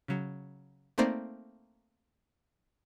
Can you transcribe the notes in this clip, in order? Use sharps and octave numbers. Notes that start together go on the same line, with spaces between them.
C#3 F#3
A3 A#3 C4 D#4 C5 D5